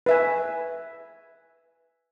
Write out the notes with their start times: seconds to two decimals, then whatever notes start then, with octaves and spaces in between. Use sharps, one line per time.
0.06 B4 E5 G#5